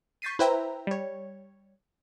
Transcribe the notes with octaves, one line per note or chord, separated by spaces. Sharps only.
C#6 G6 A6 B6 C7 D#7
E4 B4 C5 E5 G5 A#5
G3 C#5